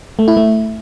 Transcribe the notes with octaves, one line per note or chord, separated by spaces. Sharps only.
A3
E4
A3